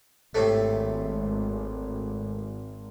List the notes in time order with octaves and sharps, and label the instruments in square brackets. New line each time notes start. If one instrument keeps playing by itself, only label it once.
[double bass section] G#1 [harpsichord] A2 C3 A3